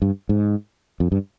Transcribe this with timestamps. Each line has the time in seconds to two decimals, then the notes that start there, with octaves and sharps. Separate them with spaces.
0.02 G2
0.29 G#2
1.00 F2
1.12 G2